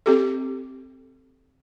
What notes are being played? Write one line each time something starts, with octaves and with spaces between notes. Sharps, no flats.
C4 G4 A4